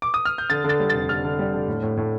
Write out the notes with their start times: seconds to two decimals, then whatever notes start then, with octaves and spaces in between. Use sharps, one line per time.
0.02 D6
0.14 D#6
0.25 F6
0.38 G6
0.50 D3 A6
0.64 D3 A6
0.80 G3
0.90 F1 A6
1.09 D3 F6
1.24 D3
1.39 G3
1.54 D3
1.68 A2
1.83 A2
1.97 A2